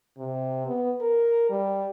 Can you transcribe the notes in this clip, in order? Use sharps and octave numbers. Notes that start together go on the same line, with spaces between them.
C3
B3
A#4
G3